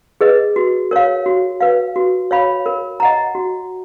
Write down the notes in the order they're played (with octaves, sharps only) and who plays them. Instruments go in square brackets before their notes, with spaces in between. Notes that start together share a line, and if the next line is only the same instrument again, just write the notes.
[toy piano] G#4 B4 D#5
F#4
A#4 C#5 F5
F#4
B4 F5
F#4
C#5 F5 B5
A#4
D#5 F#5 A#5
F#4